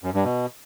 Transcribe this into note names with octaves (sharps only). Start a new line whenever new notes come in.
F#2
G2
B2